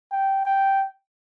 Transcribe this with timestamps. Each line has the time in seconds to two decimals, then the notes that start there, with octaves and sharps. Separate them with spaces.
0.11 G5
0.45 G5